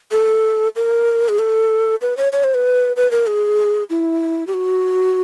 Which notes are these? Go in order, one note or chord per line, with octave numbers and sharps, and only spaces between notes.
A4
A#4
G#4
A4
B4
C#5
C#5
C5
B4
B4
A#4
G#4
E4
G4
F#4